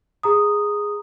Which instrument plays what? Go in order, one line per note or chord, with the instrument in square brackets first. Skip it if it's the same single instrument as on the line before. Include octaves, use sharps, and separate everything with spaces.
[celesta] G#4 A#5 D#6